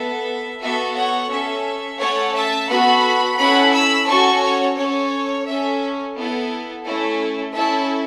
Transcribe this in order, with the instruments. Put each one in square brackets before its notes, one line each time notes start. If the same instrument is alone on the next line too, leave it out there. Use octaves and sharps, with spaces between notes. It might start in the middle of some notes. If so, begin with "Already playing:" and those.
Already playing: [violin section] B3 A4 E5
B3 F#4 A4 E5
C#5 F#5
C#4 A4 E5
A3 C#4 A4 C#5 F#5
E5 A5
B3 F#4 A4 F#5 B5
C#4 E4 A4 F#5 B5
B5 E6
C#4 F#4 A4 A5 C#6
C#5
C#4 A4 C#5
C#4 A4 E5
B3 E4 A4
A3 C#4 E4 A4
C#4 E4 A4 E5 A5